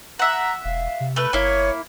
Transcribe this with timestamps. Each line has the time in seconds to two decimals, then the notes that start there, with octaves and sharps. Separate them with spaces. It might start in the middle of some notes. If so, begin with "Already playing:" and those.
0.19 E5 F#5 A#5
0.65 E1 F5
1.00 C3
1.16 A3 B4
1.33 G1 A#3 E4 C#5